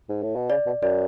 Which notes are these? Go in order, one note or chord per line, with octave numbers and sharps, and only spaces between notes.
G#2
A2
B2
C#3 D5
B2
F#2 D5